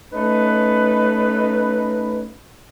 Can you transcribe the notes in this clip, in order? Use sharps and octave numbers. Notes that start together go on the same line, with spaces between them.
A3 C#4 D#4 B4